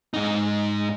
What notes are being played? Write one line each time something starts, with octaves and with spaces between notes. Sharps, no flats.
G#2 D#4